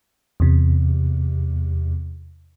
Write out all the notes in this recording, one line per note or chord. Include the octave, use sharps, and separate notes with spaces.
E2 C3